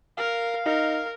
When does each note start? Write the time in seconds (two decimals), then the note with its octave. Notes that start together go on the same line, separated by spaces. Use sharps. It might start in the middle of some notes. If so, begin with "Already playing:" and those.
0.18 A#4 F5
0.66 D#4 A#4